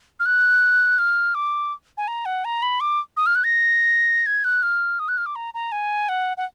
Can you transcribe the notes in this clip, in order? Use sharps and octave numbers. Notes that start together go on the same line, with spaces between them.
F6
F#6
F6
D6
G#5
A#5
F#5
A#5
B5
D6
D#6
F6
F#6
A#6
G#6
F#6
F6
D#6
F#6
F6
D6
A#5
A#5
G#5
F#5
F#5